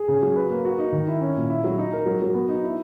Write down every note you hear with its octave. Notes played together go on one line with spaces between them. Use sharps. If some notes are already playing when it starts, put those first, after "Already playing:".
Already playing: G#4
C#3
F#3
B4
A#3
F#4
D#4
D#3
E4
C#4
A#2
E4
F#3
D#4
A#4
F#3
F#3
B3
D#4
E4